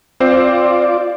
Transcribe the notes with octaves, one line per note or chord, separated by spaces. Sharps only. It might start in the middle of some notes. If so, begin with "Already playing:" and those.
C4 F4 C5 D5